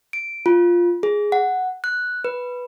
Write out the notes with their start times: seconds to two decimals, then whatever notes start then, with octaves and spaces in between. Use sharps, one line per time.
0.13 D7
0.46 F4
1.03 G#4
1.32 F#5
1.84 F#6
2.24 B4